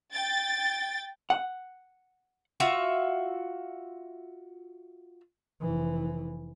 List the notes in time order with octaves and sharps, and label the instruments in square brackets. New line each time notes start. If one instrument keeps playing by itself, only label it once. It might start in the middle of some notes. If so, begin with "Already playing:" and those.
[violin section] G5 A6
[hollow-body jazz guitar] F#5
[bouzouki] F4 F#4 E5
[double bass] F1 E3